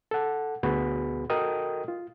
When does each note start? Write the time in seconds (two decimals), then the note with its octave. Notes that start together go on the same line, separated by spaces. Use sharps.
0.11 A4 F#5
0.63 D2 B3 F#4 G#4 B5
1.30 F#4 A4 A#4 D#5 G5 D#6
1.88 F4